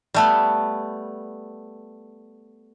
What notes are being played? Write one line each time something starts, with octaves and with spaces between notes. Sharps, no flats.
G3 A3 B3